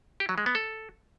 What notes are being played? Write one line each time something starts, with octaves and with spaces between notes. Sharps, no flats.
G4
F#3
G#3
B3
A4